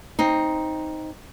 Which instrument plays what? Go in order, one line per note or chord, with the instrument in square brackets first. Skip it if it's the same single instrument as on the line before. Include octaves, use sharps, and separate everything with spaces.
[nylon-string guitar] C4 D#4